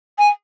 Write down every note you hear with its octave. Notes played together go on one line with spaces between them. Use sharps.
G#5